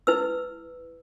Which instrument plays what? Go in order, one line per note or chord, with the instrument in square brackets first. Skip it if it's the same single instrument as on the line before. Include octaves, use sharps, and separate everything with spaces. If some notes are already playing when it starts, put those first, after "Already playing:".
[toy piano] E4 B4 E6